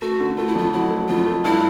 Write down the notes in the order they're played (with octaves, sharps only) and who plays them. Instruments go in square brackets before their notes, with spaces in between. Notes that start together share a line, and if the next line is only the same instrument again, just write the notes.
[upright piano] A3 [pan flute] F#4
[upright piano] D3
[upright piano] A3 [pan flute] F4
[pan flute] E4
[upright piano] F2 [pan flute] F4
[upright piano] F#3 [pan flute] E4
[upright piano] A3
[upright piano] F2 [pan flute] F4
[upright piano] A3
[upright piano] G2 [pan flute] E4